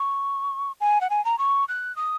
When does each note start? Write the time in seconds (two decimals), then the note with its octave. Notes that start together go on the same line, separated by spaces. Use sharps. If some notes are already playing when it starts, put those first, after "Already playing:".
Already playing: C#6
0.81 G#5
1.01 F#5
1.10 G#5
1.25 A#5
1.38 C#6
1.68 F#6
1.96 D#6